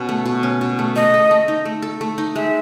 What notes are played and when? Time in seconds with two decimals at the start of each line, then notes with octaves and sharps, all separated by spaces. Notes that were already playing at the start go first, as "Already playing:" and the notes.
Already playing: B2 C#4
0.09 A3
0.26 B2
0.43 C#4
0.61 B2
0.79 A3
0.96 A3 D#5
1.14 A4
1.31 A3
1.48 D#4
1.65 A3
1.82 A4
2.01 A3
2.18 D#4
2.36 G#3 E5